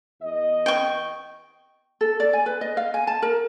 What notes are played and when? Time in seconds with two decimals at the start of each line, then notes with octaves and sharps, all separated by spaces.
0.22 E2 D#5
0.66 G5 C#6
2.01 A4
2.20 D5
2.33 G#5
2.46 B4
2.61 D#5
2.77 F5
2.94 G#5
3.07 A5
3.22 A#4